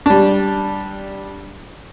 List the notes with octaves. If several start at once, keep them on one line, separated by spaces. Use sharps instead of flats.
G3 D4